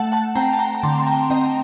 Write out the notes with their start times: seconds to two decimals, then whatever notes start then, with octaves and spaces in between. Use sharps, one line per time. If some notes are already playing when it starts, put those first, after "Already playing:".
Already playing: A3 F#5 A5
0.12 F#5 A5
0.35 C4 G5 A#5
0.53 A5
0.59 G5 A#5
0.75 A#5
0.83 D3 A5 C6
0.98 C6
1.07 G5 A#5
1.30 C4 D#5 G5